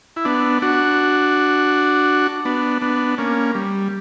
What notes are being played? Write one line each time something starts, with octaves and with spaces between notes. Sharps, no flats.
E4
B3 D4
D4 F#4
B3 D4
B3 D4
A#3 C#4
G3